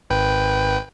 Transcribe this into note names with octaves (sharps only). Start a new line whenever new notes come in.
G#1 B4 G5